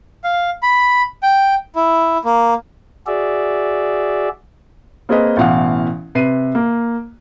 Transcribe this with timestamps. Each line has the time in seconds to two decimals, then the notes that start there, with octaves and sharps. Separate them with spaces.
0.24 F5
0.63 B5
1.23 G5
1.75 E4
2.25 A#3
3.07 F#4 G#4 D5 E5
5.09 A#3 C4 G#4 B4 D#5
5.37 A1 B2 E3 F5 F#5
6.15 C3 B4 C7 D#7
6.55 A#3